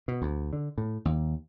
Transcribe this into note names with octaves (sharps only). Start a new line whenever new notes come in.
B2
D2
D3
A2
D#2